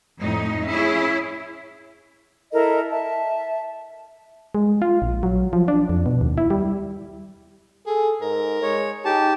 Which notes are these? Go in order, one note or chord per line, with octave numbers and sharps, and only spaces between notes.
F2 A2 D#4
C#4 E4 G#4
E4 A4 A#4 D#5
E5 A5
G#3
F4
A#1
F#3
F3
D4
F2
B2
D#2
E4
G3
G#4 A4
G#2 A#4
G#3 C#5
D#4 G4 G#4 A5